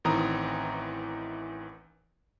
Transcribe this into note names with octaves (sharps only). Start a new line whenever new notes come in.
A1 D#3 E3 C4 A#5 D#6